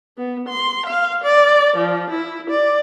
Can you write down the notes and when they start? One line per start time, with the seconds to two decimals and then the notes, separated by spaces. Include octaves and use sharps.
0.17 B3
0.49 C6
0.86 F5
1.24 D5
1.76 F3
2.11 E4
2.50 D5